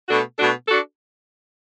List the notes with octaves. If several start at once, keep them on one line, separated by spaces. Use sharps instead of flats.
B2 A3 D4 F#4 A4
B2 A3 D4 F#4 A4
D4 F#4 A4